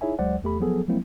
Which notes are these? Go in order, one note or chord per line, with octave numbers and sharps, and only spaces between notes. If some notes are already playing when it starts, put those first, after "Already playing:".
D#4 E4 G#4 C#5 E5 G#5
D2 F#3 G#3 C5 D5 F#5
E2 A3 G4 A4 B5
F3 F#3 B3 G#4 A4
F3 F#3 G#3 A#3 C4 E4